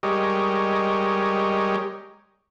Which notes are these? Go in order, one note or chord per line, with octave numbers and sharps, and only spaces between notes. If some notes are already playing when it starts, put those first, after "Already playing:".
G3 G#3 G4 A#4 C#5 D#5